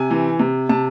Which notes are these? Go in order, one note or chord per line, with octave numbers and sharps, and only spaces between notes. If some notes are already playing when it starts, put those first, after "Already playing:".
Already playing: C3 G#5
E3
C3
C3 A5